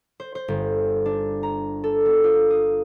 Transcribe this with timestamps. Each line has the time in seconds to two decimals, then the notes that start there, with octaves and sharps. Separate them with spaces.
0.20 C5
0.35 C5
0.48 G1
1.05 D4
1.43 A#5
1.84 A4
2.05 B3
2.24 F4
2.50 D#6